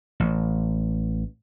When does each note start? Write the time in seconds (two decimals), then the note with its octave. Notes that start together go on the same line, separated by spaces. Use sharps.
0.20 A1